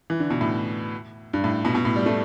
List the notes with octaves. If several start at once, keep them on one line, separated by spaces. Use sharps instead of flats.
E3
D3
B2
A2
G2
A2
B2
B2
A2
G3
A3